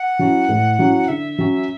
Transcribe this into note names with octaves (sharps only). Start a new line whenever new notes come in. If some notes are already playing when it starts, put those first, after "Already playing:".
Already playing: F#5
F#3 C#4 E4
A2
F#3 C#4 E4
D3 E5
F#3 C#4